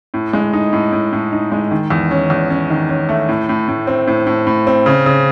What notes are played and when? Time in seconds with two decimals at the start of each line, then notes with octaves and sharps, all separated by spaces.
0.14 A2
0.33 G#3
0.53 D#4
0.73 A2
0.92 A2
1.12 A2
1.32 D#4
1.52 G#3
1.71 D#3
1.90 E2
2.11 C#4
2.30 E2
2.50 C#4
2.70 D#3
2.89 C#4
3.09 A3
3.29 A2
3.49 A2
3.68 A2
3.87 C4
4.07 A2
4.27 A2
4.47 A2
4.67 C4
4.86 C#3
5.06 C#3